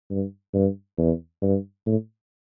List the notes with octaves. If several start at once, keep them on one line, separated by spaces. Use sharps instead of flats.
G2
G2
E2
G2
A2